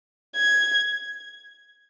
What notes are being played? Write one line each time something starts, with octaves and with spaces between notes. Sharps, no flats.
G#6